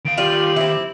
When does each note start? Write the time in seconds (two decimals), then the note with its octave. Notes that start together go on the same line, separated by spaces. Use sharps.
0.05 D#3 F5 D7
0.18 G3 F4 G4 F#7
0.56 C4 E4